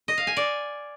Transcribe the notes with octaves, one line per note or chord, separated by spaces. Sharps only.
D#5
F5
G#5
D5